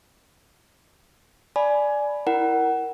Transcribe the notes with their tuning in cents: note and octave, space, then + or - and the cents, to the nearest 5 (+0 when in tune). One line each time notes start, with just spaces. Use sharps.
D5 +0 G#5 +15 B5 +0
E4 +0 A#4 +0 F#5 +25